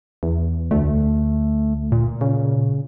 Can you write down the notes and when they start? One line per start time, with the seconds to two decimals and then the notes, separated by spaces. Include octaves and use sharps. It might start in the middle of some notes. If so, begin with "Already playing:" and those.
0.23 E2
0.71 D2 A3
1.92 A#2
2.21 C#3